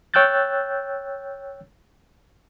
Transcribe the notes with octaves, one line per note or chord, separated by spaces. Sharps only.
C#5 G5 E6 F#6 G6 A6